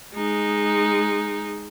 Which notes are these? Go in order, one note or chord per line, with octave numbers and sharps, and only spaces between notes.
G#3 D#4